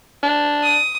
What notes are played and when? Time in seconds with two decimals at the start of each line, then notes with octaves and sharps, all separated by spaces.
0.23 D4
0.63 D#6